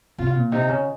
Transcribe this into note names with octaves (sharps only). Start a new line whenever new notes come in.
C3 F4
A#2
C3 D#4
C#3